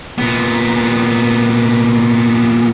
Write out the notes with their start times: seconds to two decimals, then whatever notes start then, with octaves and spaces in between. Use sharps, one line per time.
0.18 A#2 B3